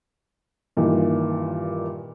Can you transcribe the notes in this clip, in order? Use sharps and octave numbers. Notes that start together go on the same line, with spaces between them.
G2 A#2 D#3 E3